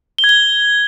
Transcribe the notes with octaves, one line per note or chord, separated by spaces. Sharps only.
G7
G#6
G7